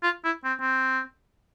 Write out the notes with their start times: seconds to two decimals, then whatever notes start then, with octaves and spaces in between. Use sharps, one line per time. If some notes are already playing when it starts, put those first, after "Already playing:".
0.03 F4
0.24 E4
0.45 C4
0.60 C4